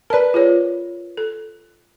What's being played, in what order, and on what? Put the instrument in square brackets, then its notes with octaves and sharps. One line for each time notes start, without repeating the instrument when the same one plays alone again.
[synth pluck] A#4 B4 [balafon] D5 A5
[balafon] F4 G#4 C#5
A4